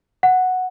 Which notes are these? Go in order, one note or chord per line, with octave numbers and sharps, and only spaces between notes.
F#5